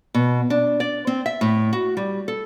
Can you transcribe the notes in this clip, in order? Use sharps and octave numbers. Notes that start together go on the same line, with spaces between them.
B2
D4
D5
C4
E5
A2
F#4
G3
A4